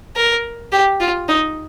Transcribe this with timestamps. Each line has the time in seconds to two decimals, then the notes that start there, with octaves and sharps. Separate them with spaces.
0.17 A#4
0.72 G4
1.01 F4
1.28 D#4